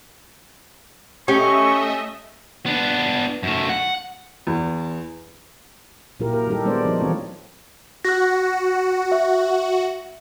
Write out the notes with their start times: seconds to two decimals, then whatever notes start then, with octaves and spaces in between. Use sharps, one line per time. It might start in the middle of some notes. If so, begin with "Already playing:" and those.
1.28 A3 C#4 G4 D#5 E5 C#6
2.66 B3 D4
3.43 F#2 A3
3.69 F#5
4.47 E2
6.20 A#2 F#3 E4 F4 G4 A#4
6.33 A#4
6.47 D#3 G3 D#4 G4 A4
6.65 G3 G#3 B3 D4 C5 D5
6.85 F3 D#4
7.00 E3 F#3 A3 C4 F4 C#5
8.05 F#4 F#6 A#6
9.12 E5